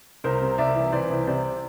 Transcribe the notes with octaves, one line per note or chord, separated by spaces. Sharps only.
C2 A#4 C5
C3
C2 D5 E5
E3
E3 C5 D5
C2
C3 C5 D5